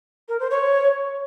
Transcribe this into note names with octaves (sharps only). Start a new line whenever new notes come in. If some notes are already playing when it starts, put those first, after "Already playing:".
A#4
C5
C#5